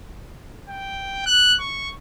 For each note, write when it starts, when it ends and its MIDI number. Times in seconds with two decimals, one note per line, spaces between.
0.69 1.26 79
1.26 1.54 90
1.60 1.89 85